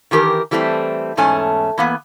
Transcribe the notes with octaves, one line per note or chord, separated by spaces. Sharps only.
D#3 E3 G4 A4 A#4
E3 G3 A3 B3 C4
E2 G#2 A3 C#4 G#5 A5
E3 A#3 B3